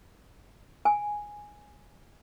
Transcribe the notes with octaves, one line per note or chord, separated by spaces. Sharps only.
G#5